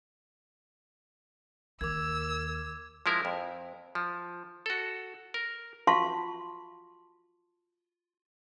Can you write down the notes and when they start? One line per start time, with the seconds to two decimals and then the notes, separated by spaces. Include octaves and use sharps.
1.81 D#2 A#4 D6 E6 G#6
3.06 F3 G#3 E4 A#4
3.25 F2
3.95 F3
4.66 F#4 A4
5.34 A#4
5.87 F4 F#4 F5 A5 C6 C#6